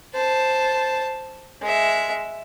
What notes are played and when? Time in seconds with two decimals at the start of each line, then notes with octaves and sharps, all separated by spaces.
0.15 C5 A5
1.62 G#3 E5